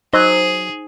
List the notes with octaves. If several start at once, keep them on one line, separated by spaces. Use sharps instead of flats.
F#3 D#4 G#4 C5